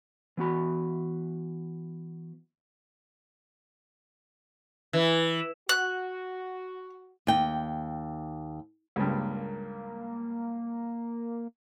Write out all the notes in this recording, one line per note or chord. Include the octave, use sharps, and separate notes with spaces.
E3 B3 F#4 B5
E3
F#4 F#6
D#2 G5
C#2 G2 A#3